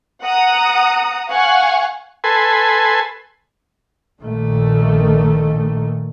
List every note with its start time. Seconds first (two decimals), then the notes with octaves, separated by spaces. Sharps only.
0.23 F#5 A#5 D#6
1.29 F5 F#5 G#5 C#6
2.24 A4 B4 G#5 C6
4.20 A#1 A#2 D#3 A3